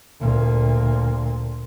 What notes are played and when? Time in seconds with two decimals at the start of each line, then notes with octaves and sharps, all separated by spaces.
0.20 D2 A#2